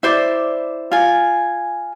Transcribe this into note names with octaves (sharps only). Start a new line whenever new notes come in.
E4 C5 D5 D6
F4 G#5